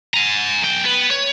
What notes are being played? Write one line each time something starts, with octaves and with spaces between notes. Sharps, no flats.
G#5 A#5
B1 G5
B3 B4
C#5